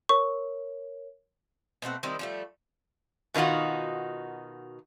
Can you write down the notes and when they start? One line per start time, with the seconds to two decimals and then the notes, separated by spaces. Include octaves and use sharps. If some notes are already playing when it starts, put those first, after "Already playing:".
0.09 A#4 C#5 C#6
1.82 B2 A3 C4 F#5
2.03 D#3 G3 C4 E4
2.19 F3 G3 A3
3.34 B2 D#3 D#4 F4 F#4